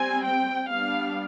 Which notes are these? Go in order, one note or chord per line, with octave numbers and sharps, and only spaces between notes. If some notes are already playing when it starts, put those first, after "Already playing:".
Already playing: G3 C4 G#5
G5
G3 B3 D4 F5